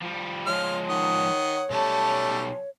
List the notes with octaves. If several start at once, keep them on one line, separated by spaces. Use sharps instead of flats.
F3 G3
F3 G#3 F4 C#5 F6
D#3 F#5 D#6
B1 G3 A3 C#4 A5